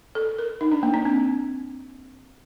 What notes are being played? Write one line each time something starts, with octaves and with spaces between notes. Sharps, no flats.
A4
A#4
D#4
D4
A#3
D4
C4